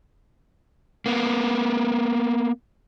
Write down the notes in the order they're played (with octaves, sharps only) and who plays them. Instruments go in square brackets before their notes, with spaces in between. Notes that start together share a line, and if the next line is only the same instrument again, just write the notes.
[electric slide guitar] A#3 B3